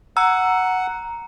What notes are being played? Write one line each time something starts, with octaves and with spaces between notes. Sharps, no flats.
F#5 A#5 E6